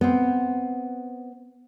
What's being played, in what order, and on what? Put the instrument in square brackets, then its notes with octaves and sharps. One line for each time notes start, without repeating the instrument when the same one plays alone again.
[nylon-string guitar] B3 C4